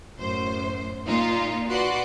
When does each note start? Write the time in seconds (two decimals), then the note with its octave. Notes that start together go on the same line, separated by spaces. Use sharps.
0.17 F#2 A2 C5
1.05 A#2 D#4 F4
1.69 F#4 B4 D5 F#5 C6